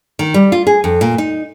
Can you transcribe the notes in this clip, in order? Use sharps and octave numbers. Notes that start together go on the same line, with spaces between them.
D#3
G3
F4
G#4
F2
A#2
D#4